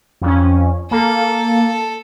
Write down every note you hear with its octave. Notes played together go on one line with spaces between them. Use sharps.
F2 C#4
A#3 A4